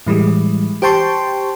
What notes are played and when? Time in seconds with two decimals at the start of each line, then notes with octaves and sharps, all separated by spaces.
0.07 A2 E3 G3 G#3
0.82 G4 C5 G5 A5 C6 C#6